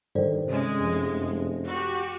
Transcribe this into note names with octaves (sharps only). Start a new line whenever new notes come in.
G2 D#3 A4 C5 D5
C3 G#3 C#4
F1 F#2 F3
F#4 G4